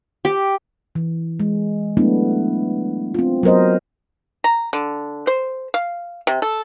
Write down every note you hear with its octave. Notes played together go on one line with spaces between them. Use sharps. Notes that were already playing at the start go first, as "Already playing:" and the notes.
G4
E3
G#3
F#3 A3 B3 D4 E4
C4 F4
F#3 B3 A#4 C5 D#5
A#5
D3
C5
F5
C3
A4